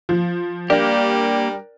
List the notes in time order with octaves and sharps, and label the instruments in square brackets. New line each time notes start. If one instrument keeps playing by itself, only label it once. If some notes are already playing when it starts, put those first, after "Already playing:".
[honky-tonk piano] F3
[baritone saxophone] G3 [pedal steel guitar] A#3 G4 [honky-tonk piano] D4 [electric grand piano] A#4 G5